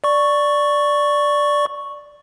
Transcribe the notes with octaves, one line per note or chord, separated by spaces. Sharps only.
D5 C#6